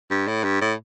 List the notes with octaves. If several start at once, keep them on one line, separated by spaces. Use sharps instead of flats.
G2
A2
G2
A2